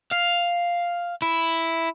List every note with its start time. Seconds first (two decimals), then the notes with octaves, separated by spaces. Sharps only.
0.11 F5
1.22 E4